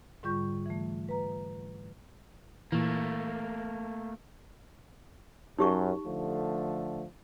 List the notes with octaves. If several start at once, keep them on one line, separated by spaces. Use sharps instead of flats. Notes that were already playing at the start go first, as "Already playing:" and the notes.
G#2 D3 G3 F4 C#6 G6
E3 A3
B4 A#5
A#2 E3 A3 A#3
F#2 D#4 G4 C#6
D3 F3 A3